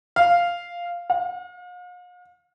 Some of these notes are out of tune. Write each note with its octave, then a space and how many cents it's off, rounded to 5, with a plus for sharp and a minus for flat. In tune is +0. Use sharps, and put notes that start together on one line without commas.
F5 -5
F5 +45